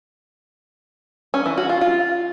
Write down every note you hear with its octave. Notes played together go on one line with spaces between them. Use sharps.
C#4
E3
F#4
F4
F4